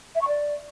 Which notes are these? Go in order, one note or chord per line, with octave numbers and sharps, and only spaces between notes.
E5
C#6
D5